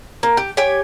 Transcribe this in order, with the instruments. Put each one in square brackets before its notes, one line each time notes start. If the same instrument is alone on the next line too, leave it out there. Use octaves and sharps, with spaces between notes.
[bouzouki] A#3
G4
G4 C#5 G5 G#5